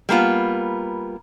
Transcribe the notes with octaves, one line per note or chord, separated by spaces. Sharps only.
G3 A#3 B3 F4